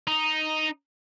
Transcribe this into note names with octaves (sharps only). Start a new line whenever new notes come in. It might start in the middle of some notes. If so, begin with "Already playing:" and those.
D#4